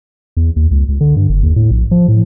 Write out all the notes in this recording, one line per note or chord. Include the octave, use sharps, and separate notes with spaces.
E2
D#2
C#2
C#2
D3
G2
F#1
D#2
A2
A#1
F3
A2